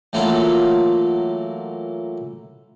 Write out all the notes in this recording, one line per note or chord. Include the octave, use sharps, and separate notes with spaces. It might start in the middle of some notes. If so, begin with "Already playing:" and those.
E3 F#3 A3 A#3 E4 F4